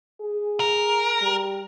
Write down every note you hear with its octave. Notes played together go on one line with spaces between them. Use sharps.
G#4
A#4
G3